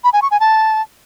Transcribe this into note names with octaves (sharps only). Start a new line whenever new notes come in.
B5
G#5
C#6
G#5
A5